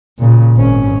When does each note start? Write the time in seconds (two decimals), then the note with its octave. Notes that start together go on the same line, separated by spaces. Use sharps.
0.19 A#2 C#3
0.56 G#1 C#4